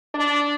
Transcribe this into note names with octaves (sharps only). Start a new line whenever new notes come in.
D4